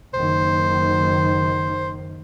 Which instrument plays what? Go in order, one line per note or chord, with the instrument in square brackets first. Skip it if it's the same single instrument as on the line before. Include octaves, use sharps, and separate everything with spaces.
[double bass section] F#1 D#3 [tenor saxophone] C5